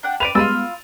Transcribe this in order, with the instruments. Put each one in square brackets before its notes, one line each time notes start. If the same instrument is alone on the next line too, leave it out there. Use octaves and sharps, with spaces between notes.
[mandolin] D4 F#5 G5
[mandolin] B4 C5 D5 [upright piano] D7 D#7 F7
[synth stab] G3 G#3 B3 [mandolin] F4 B5 E6 [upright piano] A6 D#7